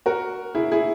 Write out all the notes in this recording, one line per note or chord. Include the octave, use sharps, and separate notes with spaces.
F#4 A#4
E4 G#4
E4 G#4